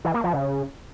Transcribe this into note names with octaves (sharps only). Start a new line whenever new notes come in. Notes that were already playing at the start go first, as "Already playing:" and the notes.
E3
A#3
F3
C#3